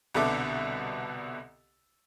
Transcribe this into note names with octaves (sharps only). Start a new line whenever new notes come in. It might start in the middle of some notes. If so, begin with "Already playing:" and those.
C2 B2 D3 A4 E5 D6